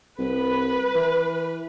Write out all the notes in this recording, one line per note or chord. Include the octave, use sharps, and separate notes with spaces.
C2 B4
E3